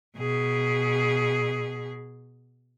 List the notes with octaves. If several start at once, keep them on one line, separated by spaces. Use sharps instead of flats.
B2 G#4